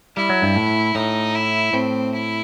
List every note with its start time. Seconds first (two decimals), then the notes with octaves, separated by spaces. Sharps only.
0.16 G3 E4
0.29 F#3
0.42 G2
0.56 A2
0.95 A2 D#4
1.35 E4
1.73 A2 C4
2.13 E4